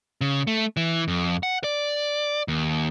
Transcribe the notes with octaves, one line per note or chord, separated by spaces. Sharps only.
C#3
A3
E3
F2
F#5
D5
D#2